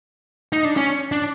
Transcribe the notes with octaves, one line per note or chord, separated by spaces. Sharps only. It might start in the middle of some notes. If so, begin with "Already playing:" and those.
D#4
D4
C#4
D4